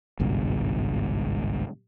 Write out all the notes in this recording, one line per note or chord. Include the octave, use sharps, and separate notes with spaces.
G#1 C#2 G2 B2